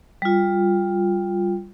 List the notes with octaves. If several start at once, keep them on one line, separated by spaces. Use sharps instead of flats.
G3 F4